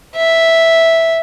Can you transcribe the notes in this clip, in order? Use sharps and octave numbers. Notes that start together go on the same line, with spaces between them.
E5